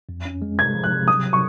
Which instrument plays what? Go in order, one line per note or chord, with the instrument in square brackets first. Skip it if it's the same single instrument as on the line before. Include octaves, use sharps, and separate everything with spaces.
[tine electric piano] F2
C#4
G#3
[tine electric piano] C3 [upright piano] G#6
[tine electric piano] F3
[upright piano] F#6
[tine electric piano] C3
[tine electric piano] F#3 [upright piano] D#6
[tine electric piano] F#3
[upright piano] C#6